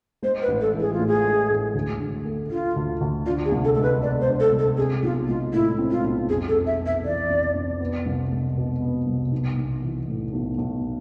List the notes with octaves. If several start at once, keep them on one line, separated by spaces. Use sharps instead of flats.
G#3 C5
B4
A1
A4
E3
G#4
F4
A2
G#4
G#3
A1
D2
D2
A3
D3 F4
D2
D2
D4 F4
G#4
C2
A4
G#3 A4
B4
B2 D5
C5
D4
A4
C2
A4
C4 G#4
B1 F4
G#3 F4
A2 E4
C4
F4
B1
F2 G#4
A4
F2
E5
B3
E5
E3 D5
F2
F2
B3
C2
G#3
B2
B3
C2
B1
B1
E3
A2
B1
B1